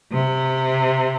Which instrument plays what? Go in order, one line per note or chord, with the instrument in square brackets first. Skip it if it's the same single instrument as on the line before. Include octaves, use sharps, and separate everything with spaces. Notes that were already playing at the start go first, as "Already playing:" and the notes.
[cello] C3